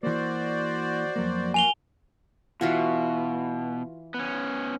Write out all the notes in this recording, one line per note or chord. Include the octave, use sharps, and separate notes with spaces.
E3 A#3 F#4 C5 D5
F2 F#3 A#3
F#4 A#4 F5 G#5 F7 G7
B2 E3 F4 F#4
B3 C#4